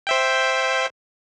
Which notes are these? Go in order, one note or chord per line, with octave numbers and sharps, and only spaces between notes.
C5 E5 G5